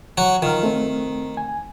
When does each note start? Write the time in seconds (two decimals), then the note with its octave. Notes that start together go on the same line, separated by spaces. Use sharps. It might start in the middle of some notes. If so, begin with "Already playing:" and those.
0.18 F#3 F#4
0.42 D#3 F4 F6
0.63 A3 C4
1.37 G#5